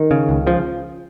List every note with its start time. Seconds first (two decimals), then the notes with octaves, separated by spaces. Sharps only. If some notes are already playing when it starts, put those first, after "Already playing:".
Already playing: D#3
0.11 C#3
0.29 C#2
0.47 C#3 F3